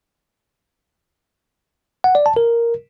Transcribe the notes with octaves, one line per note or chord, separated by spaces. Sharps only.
F#5
D5
A5
A#4